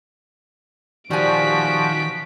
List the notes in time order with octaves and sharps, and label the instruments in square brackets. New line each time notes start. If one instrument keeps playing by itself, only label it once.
[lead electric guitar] D#3 F4 [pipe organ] F3 F#4 [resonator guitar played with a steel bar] G3 G#5 [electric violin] B6 D7